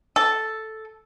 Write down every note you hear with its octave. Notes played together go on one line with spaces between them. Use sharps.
A4